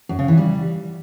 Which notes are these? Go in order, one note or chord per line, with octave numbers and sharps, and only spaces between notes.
F#2
C#3
E3
G3